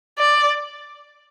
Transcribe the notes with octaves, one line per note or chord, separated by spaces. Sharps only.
D5